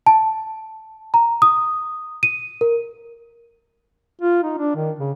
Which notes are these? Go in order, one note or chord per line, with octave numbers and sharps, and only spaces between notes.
A5
A#5
D#6
D#7
A#4
F4
D#4
D4
D#3
C#3